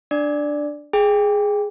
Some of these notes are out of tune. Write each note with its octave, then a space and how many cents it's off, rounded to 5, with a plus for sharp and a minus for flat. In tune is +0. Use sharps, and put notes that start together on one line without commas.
D4 +0 D5 +0
G#4 +0 G5 +20